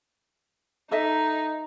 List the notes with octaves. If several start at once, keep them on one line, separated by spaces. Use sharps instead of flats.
D#4 A4 D#5 E5